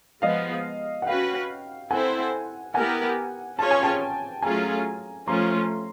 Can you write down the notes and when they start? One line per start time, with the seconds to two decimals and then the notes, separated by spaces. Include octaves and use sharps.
0.22 F3 G#3 B3 D#5 F5
1.02 F#5
1.06 C#4 F#4 B4 F5 G5
1.91 C4 E4 A4 C5 F#5 G#5
2.74 B3 E4 G4 A#4 F#5 G#5
3.59 C#4 F4 G#4 C#5 A5
3.71 G#5
3.83 G5 A5
4.42 F#3 A3 C#4 F4 G#4 G#5 A#5
5.27 F3 A3 C#4 F4 A#5 C6